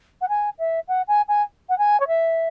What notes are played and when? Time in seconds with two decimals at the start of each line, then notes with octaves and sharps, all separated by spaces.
0.21 F#5
0.29 G#5
0.59 E5
0.88 F#5
1.08 G#5
1.28 G#5
1.69 F#5
1.78 G#5
2.00 C#5
2.07 E5